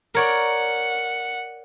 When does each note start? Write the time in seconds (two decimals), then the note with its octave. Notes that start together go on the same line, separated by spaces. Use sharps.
0.15 A#4 C#5 D5 F#5